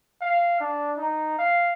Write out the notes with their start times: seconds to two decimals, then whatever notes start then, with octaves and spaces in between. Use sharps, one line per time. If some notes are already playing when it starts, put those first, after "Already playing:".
0.21 F5
0.60 D4
0.98 D#4
1.39 F5